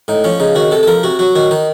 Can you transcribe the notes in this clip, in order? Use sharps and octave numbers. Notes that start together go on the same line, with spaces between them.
A2 D#4
F3 C#4
C#3 D#4
D#3 F#4
C3 A4
A4
F3 A#4
C3 F#4
F#3 F#4
D#3 F#4
D#3 D#4